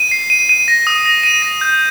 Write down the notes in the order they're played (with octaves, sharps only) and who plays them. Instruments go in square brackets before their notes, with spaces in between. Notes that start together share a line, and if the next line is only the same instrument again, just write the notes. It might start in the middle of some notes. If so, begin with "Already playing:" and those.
Already playing: [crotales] D#7
C7
D#7
D#7
A#6
D#6
A#6
D#7
A#6
G6